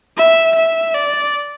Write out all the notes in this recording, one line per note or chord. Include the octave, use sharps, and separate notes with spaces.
E5
E5
D5